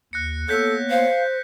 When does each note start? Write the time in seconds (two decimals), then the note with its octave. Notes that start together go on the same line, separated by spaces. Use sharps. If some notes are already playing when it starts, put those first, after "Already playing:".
0.13 D#2 F#6 A#6 C#7
0.49 A#3 B3 A4 C#5 G6 B6
0.90 C5 F5